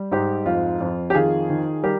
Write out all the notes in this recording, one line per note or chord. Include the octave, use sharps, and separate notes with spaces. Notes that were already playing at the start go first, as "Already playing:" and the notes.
Already playing: G3
G#2 D#4 G4
F2 F4
F2
G4
D#3 F4 G#4
D#3
G3 G4 A#4